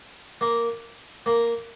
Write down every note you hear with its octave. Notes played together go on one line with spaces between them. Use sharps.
A#3
A#3